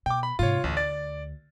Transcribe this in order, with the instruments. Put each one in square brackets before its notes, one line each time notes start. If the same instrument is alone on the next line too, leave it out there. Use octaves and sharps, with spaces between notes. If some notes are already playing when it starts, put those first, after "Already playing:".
[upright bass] B2 [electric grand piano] G5 D6
[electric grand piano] B5
[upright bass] G#2 C3 [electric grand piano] F4 C#5
[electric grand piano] A1 [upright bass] D2
[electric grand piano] D5 A6